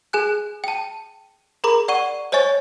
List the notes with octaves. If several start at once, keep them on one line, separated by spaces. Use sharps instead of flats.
G#4 G#5 F#6
G5 A5
G#4 A#4 A#5 B5 D6
D5 F#5 C#6 D#7
C5 C#5 D#5 G#5 C#6 A6